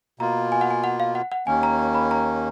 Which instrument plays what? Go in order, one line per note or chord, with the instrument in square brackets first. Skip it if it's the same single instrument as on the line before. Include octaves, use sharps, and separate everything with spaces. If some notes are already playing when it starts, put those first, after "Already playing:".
[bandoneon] B2 A#3 F4 [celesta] A#5
[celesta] G#5
F#5
G#5
F#5
F5
F#5
F#5
[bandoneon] D#2 D#3 A#3 C#4 [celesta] G#5
[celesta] A#5
A#5
B5
A#5